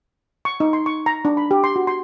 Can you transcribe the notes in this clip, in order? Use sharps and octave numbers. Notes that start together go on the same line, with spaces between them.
C#6
D#4
C6
C#6
A#5
D4
B5
G4
C6
F#4
C6